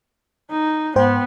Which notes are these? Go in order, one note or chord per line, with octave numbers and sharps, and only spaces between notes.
D#4
G#2 B3 C5 G5